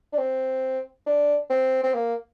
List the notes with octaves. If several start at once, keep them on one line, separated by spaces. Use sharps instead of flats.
D4
C4
D4
C4
C4
A#3